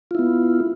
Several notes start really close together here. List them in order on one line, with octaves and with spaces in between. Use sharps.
F4 E4 B3